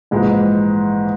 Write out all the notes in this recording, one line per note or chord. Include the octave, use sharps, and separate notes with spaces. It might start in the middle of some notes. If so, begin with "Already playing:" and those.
A#1 G#2 E3 G#3